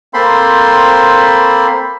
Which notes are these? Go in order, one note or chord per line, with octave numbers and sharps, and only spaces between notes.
A#3 C4 A4 C5 B5 C6